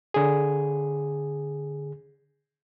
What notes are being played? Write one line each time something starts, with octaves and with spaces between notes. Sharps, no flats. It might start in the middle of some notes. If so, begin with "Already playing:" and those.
D3 G#4